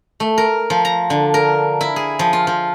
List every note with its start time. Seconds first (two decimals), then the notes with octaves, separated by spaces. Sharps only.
0.20 A3
0.38 A#4
0.70 F3
0.85 A#5
1.10 D3
1.34 A#4
1.81 E4
1.96 G#4
2.19 F3
2.33 F4
2.47 F3